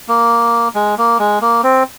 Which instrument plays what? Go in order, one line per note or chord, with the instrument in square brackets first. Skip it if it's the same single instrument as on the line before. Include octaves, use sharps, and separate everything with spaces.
[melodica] A#3
G#3
A#3
G#3
A#3
C4